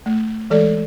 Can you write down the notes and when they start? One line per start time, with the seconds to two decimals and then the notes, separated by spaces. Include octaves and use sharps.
0.06 A3
0.50 E3 G#3 A4 D5